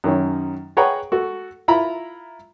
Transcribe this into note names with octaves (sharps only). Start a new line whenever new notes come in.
F#2 D#3 C#4
G#4 B4 C#5 F#5 G5 A#5
F#4 A4
E4 F4 A#5 B5